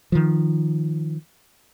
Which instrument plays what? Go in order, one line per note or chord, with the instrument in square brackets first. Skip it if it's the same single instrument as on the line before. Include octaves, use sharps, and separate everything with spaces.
[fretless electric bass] D#3 F3